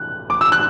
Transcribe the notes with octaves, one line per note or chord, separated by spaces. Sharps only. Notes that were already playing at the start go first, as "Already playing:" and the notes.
Already playing: F#6
D6
E6
F#6